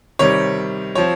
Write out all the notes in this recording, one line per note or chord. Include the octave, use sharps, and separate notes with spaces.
C3 D#3 G3 C#5
F3 C4 C#5